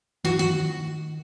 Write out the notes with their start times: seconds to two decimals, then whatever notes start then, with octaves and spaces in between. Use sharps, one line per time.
0.24 E3 F#4
0.39 D#3 F#4